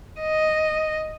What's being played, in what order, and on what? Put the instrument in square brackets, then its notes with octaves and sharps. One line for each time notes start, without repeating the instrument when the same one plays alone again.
[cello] D#5